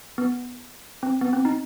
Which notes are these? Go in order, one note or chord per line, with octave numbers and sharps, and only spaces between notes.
B3
C4
B3
C4
D#4